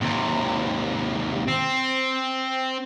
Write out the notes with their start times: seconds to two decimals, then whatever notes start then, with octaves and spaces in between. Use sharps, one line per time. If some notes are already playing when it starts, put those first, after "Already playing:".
0.01 D#2 C3
1.48 C4